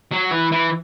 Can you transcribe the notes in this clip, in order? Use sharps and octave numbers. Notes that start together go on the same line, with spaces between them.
F#3
E3
E3